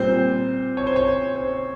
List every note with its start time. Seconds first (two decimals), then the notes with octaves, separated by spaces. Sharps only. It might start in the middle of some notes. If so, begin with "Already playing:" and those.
Already playing: A#2 G3 C4 C5
0.77 C#5
0.87 C5
0.96 C#5
1.36 C5